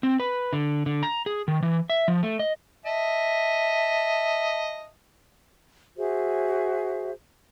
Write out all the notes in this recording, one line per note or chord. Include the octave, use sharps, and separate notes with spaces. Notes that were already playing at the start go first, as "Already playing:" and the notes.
C4
B4
D3
D3
A#5
G#4
D#3
E3
E5
F3
A3
D#5
D#5 E5 A5
F#4 G#4 C5 E5